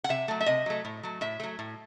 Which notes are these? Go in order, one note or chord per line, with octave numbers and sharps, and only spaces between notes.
F#5
C3 E5
F#3 A3
E5
C3 D#5
F#3 A3
A2
F#3 A3
A2 E5
F#3 A3
A2